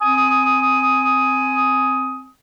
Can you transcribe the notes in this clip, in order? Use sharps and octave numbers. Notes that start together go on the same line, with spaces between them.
C4 G#5 D#6